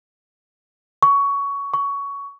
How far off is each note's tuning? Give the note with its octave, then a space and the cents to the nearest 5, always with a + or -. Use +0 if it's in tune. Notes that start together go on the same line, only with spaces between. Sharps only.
C#6 +15
C#6 +15